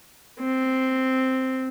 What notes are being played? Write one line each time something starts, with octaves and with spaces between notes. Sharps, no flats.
C4